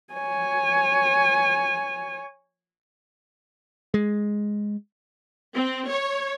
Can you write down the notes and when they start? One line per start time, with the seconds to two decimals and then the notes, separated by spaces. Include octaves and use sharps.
0.14 C#5 G#5
3.94 G#3
5.55 C4
5.90 C#5